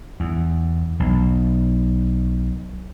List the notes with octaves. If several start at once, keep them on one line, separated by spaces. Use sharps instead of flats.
E2
B1